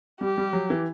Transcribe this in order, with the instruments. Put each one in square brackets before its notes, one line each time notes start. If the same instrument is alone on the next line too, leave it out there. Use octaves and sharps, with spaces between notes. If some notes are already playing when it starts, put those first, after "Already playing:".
[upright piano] G3 [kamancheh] G4
[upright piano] G3
F#3
E3